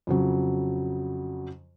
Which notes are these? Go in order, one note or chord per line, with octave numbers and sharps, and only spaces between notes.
F2 C#3 F#3